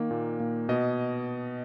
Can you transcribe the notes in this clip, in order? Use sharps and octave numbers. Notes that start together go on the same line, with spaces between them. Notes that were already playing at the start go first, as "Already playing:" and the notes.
Already playing: D#3 A#3
A#2
A#2
B2 D#5